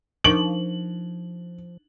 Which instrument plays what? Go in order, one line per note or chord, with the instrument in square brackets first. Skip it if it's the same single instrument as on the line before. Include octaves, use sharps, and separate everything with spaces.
[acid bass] F3 [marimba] D4 D#4 A#4 [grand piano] F#7